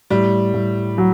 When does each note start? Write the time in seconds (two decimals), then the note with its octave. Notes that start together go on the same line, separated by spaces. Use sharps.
0.10 A2 G3
0.54 A2
0.98 F#3